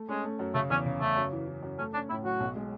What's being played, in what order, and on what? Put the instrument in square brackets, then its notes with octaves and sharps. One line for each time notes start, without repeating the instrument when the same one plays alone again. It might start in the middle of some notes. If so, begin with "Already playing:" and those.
Already playing: [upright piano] A3
[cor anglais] G#3 [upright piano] C#4
[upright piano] A3
F#2
[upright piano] C#3 [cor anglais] A3
[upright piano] E2 [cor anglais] C#4
[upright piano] C#3
[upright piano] C#3 [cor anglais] A3
[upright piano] F#2
E3
E3
F#2
[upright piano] A3 [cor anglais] C#4
[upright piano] C#4 [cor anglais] D4
[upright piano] A2 [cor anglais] E4
[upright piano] F#3 [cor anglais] F#4
[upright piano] B1
G#3